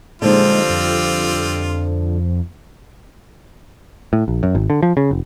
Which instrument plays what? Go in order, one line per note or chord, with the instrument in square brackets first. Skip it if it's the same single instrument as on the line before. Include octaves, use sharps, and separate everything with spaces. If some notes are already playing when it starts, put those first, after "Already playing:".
[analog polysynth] A#2 G#3 D#4 [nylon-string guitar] D3 F3 [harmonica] G3 C4 F4
[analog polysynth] F2
[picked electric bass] A2
A#1
F#2
G#1
D3
F3
C#3
F1